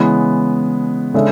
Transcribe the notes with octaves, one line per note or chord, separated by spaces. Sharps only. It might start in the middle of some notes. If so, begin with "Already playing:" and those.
Already playing: C#3 E3 G#3 B3
C#3 G#3 D4 A4 E5